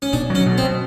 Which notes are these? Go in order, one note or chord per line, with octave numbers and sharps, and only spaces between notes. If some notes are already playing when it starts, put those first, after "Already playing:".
C#4
B2 D4
F#3
C#4
B2
C4
B2